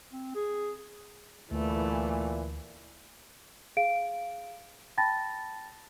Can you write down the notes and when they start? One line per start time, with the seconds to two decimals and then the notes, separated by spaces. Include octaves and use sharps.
0.12 C4
0.35 G#4
1.51 D2 A#2 E3 A3
3.77 G#4 F5 D7
4.98 G5 A5 B5 A6 A#6